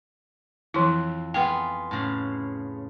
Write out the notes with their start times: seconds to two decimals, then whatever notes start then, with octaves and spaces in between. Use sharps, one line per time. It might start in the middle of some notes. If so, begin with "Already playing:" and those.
0.74 F2 E3 E4
1.34 B3 F4 G#4 G5
1.91 A2 C#3